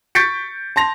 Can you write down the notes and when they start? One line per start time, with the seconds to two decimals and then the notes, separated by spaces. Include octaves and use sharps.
0.15 C#6 G6 A6 B6 C#7 D7
0.76 A5 C6 A#6 F7